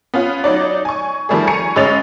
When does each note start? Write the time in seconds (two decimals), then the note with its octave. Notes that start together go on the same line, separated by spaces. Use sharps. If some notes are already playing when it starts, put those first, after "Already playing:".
0.14 B3 C#4 F4
0.44 F#3 D#4 D5
0.85 G#5 C#6
1.29 D#3 F3 G3 A3 G#4
1.47 G#5 A#5 C#6 C#7
1.76 A1 G#3 C#4 D#5 A6 F7